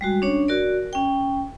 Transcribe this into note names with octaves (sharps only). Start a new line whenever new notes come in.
G3 G#3 F#4
C#4 D4 C#5
F#4 A#4 D5
C#4 G5